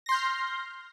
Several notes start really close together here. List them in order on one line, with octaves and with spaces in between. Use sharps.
A#6 C6 G6 F6